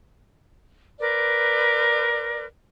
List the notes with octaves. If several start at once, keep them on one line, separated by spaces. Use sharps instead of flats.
A#4 B4 D5